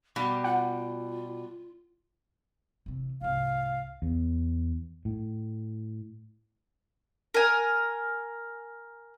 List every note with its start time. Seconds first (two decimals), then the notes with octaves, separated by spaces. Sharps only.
0.16 B2 G3 D6
0.44 F4 F#5
2.86 C3 E3
3.21 C2 G#2 F5
4.02 E2
5.05 A2
7.34 A#4 G#5